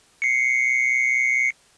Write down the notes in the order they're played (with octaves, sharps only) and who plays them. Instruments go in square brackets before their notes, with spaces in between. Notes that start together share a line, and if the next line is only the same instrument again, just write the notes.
[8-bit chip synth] C7 C#7